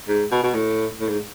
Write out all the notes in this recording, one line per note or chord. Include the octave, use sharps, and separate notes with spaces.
G#2
B2
B2
A2
A2
G#2